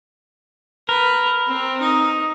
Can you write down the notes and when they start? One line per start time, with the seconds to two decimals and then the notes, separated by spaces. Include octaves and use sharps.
0.89 A#4 B4
1.47 C4
1.81 D#4